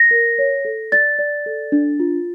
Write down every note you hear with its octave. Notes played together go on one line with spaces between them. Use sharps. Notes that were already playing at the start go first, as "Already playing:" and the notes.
Already playing: A#6
A#4
C#5
A4
D5 A6
D5
A4
D4
F4